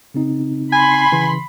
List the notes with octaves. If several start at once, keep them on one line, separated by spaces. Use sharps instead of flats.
C#3 C4 D#4
G#5 B5 C6
C#3 E3